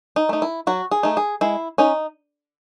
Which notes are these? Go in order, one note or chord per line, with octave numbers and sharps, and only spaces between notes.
D#4
A3 D#4
E4
F#3 F#4
G#4
A3 D#4
G#4
G#3 E4
C#4 D#4